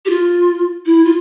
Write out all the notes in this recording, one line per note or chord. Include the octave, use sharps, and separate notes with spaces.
G4
F4
E4
F4